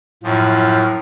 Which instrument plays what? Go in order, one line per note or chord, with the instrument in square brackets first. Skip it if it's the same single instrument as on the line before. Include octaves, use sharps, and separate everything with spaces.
[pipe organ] F#2 F3 [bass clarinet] A2